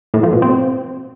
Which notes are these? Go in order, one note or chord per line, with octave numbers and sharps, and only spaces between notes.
A2
F3
B2
C4